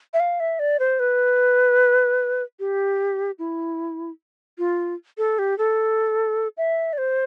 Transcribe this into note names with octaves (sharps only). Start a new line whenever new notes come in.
E5
F5
E5
D5
C5
B4
G4
E4
F4
A4
G4
A4
E5
D5
C5